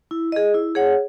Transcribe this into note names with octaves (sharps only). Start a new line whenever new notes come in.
E4
G#4 D#5
E4
G#4 C#5 F#5